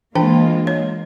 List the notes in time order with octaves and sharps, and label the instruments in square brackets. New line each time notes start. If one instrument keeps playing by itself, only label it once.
[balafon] E3 D4 G5 [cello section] G#3 A#3 F4
[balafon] C#5